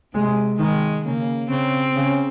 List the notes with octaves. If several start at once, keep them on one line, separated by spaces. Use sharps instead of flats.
C3 G#3
D#3 G#3
C#3 A#3
C#3 C4
C#3